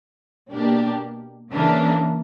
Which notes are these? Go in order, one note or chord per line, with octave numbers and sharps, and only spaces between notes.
B2 A#3 D4 G4
C#3 E3 A#3 D4